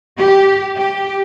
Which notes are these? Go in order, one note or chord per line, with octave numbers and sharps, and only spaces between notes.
G4
G4